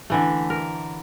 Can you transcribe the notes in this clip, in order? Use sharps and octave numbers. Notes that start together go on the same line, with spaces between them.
D3 E3 A3
A#4